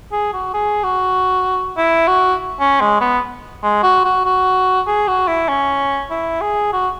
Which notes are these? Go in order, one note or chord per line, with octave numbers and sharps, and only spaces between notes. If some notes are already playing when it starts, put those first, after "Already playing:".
G#4
F#4
G#4
F#4
E4
F#4
C#4
G#3
B3
G#3
F#4
F#4
F#4
G#4
F#4
E4
C#4
E4
G#4
F#4